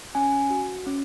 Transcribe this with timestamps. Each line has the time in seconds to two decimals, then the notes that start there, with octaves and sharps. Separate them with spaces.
0.15 C#4 G#5
0.50 F#4
0.86 C#4